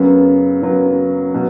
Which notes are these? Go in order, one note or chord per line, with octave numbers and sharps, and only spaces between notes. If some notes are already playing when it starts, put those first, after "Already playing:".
Already playing: F#2 C#3 F#3 B3
F#2 C#3 F#3 B3
B2 F#3